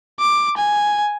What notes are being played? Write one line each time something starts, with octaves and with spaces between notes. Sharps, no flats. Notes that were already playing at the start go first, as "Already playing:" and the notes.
D6
G#5